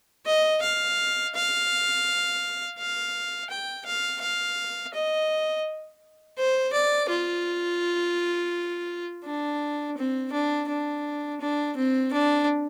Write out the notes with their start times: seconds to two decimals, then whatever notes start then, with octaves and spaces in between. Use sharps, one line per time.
0.26 D#5
0.62 F5
1.35 F5
2.79 F5
3.50 G5
3.86 F5
4.22 F5
4.94 D#5
6.38 C5
6.73 D5
7.09 F4
9.25 D4
9.98 C4
10.33 D4
10.69 D4
11.41 D4
11.77 C4
12.13 D4